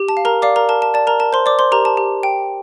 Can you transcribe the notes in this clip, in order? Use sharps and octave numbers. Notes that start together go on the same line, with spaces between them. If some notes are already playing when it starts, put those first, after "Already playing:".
Already playing: G4
A5
F5
A#4 A#5
D5 F5 D6
A#4 A#5
A#4 A5
A5
D5 A5
A#4 A#5
A#4 A5
C5 C6
C5 D5 D6
C5 C6
G4 A#4 A#5
A5
G4
G5